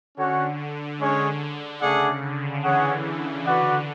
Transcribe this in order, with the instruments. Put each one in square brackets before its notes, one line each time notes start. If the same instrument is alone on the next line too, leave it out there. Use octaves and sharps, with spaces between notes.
[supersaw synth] D3 [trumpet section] C#4 F#4 C#5 F#5
[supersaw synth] D3
[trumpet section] G#3 C#4 G#4 C#5
[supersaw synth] D3
[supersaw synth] C#3 [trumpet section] A3 D4 G#4 D5 F#5
[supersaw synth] D3
[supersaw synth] E3 [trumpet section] C#4 G#4 C#5 F#5
[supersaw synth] E3
[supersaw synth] D3 [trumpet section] F#4 B4 D5 F#5